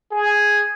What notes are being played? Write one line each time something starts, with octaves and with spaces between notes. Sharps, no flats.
G#4